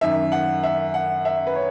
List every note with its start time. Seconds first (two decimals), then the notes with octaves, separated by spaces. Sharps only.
0.01 F#2 D#3 E5
0.32 F#5
0.63 E5
0.94 F#5
1.25 E5
1.47 B4
1.55 C#5